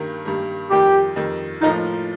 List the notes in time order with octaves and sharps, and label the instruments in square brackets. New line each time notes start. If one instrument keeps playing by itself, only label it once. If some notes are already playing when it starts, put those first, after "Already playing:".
Already playing: [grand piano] G2 D#3 G3 A#3
G2 D#3 G3 A#3
[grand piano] F2 D#3 G3 [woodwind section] G4
[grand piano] F2 D#3 G3
[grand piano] A2 F3 A#3 F4 [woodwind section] D#4